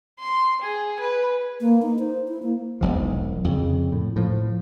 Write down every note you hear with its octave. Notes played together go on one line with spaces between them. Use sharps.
C6
G#4
B4
A#3
D#4
C5
E4
A#3
E1 B1 F3
F2 C#3
A2
A2 F3